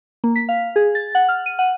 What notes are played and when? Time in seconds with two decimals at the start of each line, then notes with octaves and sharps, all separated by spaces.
0.24 A#3
0.36 B6
0.49 F5
0.76 G#4
0.95 A6
1.15 F#5
1.29 F6
1.46 D#7
1.59 F#5